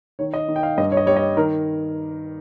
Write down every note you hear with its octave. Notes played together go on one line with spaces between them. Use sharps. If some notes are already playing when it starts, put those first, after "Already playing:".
D#3 C#5
D#5
D#3
G5
F5
G2 D#5
C#5
D#5
G3 C#5
D#5
D#3 A#4